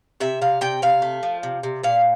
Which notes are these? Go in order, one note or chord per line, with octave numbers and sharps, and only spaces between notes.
C3 E5
C3 F5
C3 G5
C3 F5
A3
F3
C3
C3
A#2 F5